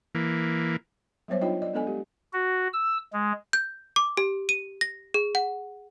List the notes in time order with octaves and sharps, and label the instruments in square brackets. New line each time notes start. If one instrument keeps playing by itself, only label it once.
[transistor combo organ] E3 A#3
[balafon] F#3 G3 B3 C5 C#5 E5
D4 D#4 F4 C#5 D#5 G5
D5 D#5
G#3 B3 D4 A4 D#5 G#5
G#3 G4
[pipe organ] F#4
E6
G#3
[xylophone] G6
D6
G4
D#7
A#6
G#4
F#5